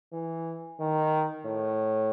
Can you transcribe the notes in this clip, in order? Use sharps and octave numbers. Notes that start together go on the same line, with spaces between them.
E3
D#3
A2